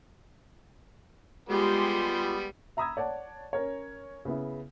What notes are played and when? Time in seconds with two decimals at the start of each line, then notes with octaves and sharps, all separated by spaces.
1.49 G3 G#3 B3 F4 G4 C6
2.77 E5 A#5 B5 D#6 E6 G#6
2.97 C#5 D5 F#5 A5
3.53 C#4 A#4 C#5
4.25 C#3 B3 E4